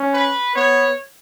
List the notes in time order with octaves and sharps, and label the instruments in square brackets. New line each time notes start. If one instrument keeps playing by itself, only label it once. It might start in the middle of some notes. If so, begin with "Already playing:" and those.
Already playing: [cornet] C#4
[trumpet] B4
[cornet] B3 [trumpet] C#5